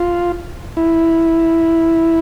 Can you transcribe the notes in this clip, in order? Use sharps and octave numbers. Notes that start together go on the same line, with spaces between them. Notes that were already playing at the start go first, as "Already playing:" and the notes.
Already playing: F4
E4